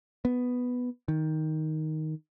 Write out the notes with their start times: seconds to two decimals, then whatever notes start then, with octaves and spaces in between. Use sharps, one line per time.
0.25 B3
1.08 D#3